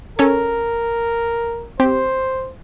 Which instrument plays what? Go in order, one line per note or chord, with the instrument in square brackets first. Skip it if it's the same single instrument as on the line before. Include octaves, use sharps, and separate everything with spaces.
[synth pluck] C#4 A4 C#5 [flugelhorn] A#4
[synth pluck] C4 G4 [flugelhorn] C5